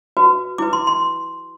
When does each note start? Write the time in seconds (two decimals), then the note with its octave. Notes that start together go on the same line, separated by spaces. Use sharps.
0.17 F#4 B4
0.58 E4 B4 D6
0.73 C6
0.87 C6